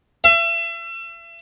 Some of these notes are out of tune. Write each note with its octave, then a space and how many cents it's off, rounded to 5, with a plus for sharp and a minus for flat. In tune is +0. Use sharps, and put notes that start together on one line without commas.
E5 +35